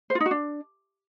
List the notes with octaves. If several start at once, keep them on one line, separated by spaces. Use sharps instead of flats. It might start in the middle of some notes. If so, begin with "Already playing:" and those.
C5
F4
D#4
F#4
D4